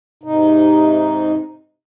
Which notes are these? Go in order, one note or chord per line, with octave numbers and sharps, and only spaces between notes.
G#2 C3 D#4